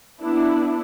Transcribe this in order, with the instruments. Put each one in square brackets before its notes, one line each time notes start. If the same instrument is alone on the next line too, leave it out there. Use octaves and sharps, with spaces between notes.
[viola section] B3 D4 E4